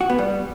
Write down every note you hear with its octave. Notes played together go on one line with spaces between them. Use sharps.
F#4
B3
G3